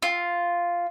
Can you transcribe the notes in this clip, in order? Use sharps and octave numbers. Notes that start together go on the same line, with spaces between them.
F4